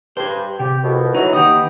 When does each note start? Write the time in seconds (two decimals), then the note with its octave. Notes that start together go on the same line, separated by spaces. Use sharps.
0.17 G2 G#4 C5
0.60 C3 G4
0.84 C2 F2 B2
1.15 E3 F#3 D#4
1.33 D#2 B3 D#4 G4 D#6